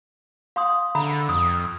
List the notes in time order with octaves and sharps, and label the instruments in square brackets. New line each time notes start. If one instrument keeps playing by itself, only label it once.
[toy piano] F5 C6 D#6
[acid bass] D3 [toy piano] E5 A#5 B5
[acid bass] F2 [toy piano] D#6